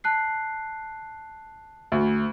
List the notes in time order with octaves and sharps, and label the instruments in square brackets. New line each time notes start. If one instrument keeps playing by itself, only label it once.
[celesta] A5 F#6 C7
[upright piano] D2